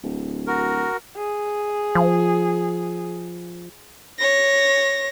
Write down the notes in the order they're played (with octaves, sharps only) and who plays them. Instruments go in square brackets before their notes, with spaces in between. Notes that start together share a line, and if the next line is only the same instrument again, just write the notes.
[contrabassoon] D1
[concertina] F#4 A#4
[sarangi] G#4
[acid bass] F3
[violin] C#5 A#6